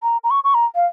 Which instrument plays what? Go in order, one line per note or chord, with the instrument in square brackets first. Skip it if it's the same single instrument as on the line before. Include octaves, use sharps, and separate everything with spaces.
[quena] A#5
A#5
C#6
C#6
A#5
F5